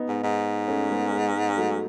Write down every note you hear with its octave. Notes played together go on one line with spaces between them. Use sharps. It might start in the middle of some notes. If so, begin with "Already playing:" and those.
Already playing: B3 D#4
G#2
G#2
A3 C#4
G#3 B3
F#3 A3